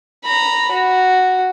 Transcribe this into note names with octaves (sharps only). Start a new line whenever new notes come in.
A#5 B5
F#4